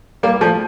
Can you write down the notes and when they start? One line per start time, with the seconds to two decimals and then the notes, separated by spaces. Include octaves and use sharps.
0.23 G3 A#3
0.41 F3 A3